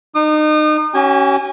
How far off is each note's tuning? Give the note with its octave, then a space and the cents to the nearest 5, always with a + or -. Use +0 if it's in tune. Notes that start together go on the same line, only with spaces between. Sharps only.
D#4 -30 D#6 -40
C#4 +0 F#4 +45 G#5 -30